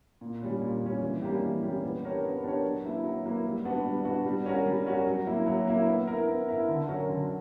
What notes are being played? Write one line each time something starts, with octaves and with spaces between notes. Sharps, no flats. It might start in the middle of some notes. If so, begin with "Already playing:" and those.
A#2
G3 C#4
A#2
G3 C#4
E3
G3 A#3 C#4 G4
E3
G3 A#3 C#4 G4
B3
D4 G4 A#4 C#5
B3
D4 G4 A#4 C#5
F#3
A#3 E4 B4
F#3
A#3 E4 B4
G3
B3 D4 F#4
G3
B3 D4 F#4
G3
C#4 F#4 A#4
G3
C#4 F#4 A#4
F#3
A#3 E4
F#3
A#3 E4
B3
E4 A#4
B3
E4 A#4
D3
F#3 C#4 F#4 A#4
D3